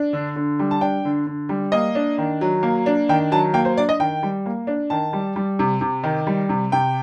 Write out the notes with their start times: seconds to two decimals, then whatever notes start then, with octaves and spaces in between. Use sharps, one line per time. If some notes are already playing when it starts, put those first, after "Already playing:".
Already playing: D4
0.13 D3
0.36 D3
0.59 G3
0.71 A5
0.81 D4 G5
1.05 D3
1.27 D3
1.49 G3
1.72 A#3 D#5
1.95 D4
2.18 D#3
2.41 F#3
2.63 A#3
2.86 D4
3.09 D#3 G5
3.32 F#3 A5
3.54 A#3 G5
3.65 C5
3.77 D4 D5
3.89 D#5
4.00 D#3 G5
4.23 G3
4.46 A#3
4.67 D4
4.90 D#3 A5
5.13 G3
5.36 G3
5.59 C3
5.81 C3
6.04 D#3
6.27 G3
6.49 C3
6.72 C3 G5